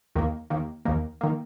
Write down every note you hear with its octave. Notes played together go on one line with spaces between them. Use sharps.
D#2 D#3 A#3
D#2 D#3 A#3
D#2 D#3 A#3
D#3 A#3